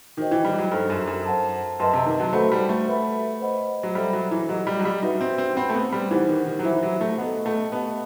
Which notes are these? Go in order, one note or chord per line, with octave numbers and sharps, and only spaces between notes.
D#3 D#4 F#4 C5 D#5 G5
E3
G3
F#3
G2 D#4 A4 C5
F#2
F#2
C5 F#5 A5
F#2 B4 D#5 A5 C6
C3
D#3
F#3
A3 F#4 A4 C5 F#5 B5
G3
A3
B4 E5 B5
C5 D#5 F#5 B5
F#3
G3 A4 C5 E5 B5
F#3
E3
F#3 G4 D#5 F#5
G3
F#3
G3
D#4 F#4 B4 E5
C4
C4
C4 C5 F#5 B5
A3
B3
G3
E3 D#4 G4 C5 F#5
D#3
D#3
F#3
E3 C5 E5 B5
F#3
A3
B3 A4 D#5 F#5
A3
B3 G4 D#5 A5